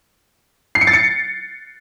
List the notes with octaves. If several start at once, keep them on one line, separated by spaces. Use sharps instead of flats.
C7
C#7
A6
C#7